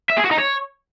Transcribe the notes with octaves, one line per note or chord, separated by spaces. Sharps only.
E5
G#4
F#4
D#4
C#5